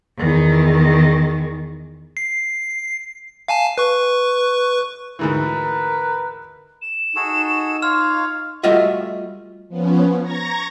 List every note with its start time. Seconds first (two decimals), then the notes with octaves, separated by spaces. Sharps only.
0.18 E2 D#3
2.17 C7
3.48 F5 G#5 A5
3.78 B4 C#6
5.19 D2 G#2 E3 A#4 B4
6.81 E7
7.16 D#4 F#4 G#4 A4
7.82 F4 C#5 F5 F6
8.63 G3 A3 F4 F#4 D#5 E5
9.69 F3 B3 C#4
10.22 A#5 C#6 G#6 A#6